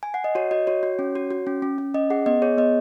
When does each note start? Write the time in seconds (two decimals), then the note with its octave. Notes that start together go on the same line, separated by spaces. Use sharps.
0.03 G#5
0.14 F#5
0.24 D#5
0.35 F#4 C#5
0.51 F#4 D#5
0.67 F#4 C#5
0.83 F#4
0.99 C#4
1.15 F#4
1.31 F#4
1.47 C#4
1.62 C#4
1.78 C#4
1.94 C#4 D#5
2.10 G#4 F#5
2.26 B3 D#5
2.42 G#4 C#5
2.57 B3 D#5